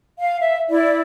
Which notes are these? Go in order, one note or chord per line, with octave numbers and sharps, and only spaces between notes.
F5
E5
E4 D5